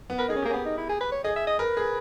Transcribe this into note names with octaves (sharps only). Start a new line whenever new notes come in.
B3
A#4 B4
D#4 G#4
C#4
A#3 G4
C#4
B3
D#4
E4
G#4
B4
C#5
G#4 D#5
E5
D#5
A#4 B4
G#4